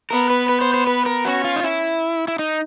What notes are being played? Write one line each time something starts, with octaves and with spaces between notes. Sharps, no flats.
B3 A#4
B4
B4
C5
C5
B4
A#4
C#4 F#4
F4
D#4
E4
E4
D#4